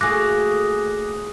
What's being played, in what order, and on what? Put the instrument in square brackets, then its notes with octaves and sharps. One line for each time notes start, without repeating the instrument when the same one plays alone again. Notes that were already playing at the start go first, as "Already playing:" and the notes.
[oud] A3 A#3 [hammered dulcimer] F#4 G#4 [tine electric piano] D6 F#6 A#6